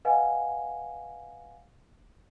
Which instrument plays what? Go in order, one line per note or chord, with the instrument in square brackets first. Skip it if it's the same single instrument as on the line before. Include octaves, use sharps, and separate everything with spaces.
[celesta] B4 D#5 F5 F#5 G#5